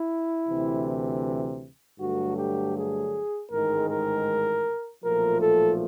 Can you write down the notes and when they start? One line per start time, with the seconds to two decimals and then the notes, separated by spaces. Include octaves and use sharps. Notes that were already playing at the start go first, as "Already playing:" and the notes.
Already playing: E4
0.48 D2 C3 E3
2.00 G2 D3 F#3 A3 F#4
2.37 G4
2.76 G#4
3.51 A1 G#2 D#3 G#3 A#4
3.90 A#4
5.04 B1 A#2 F3 A3 A#4
5.42 A4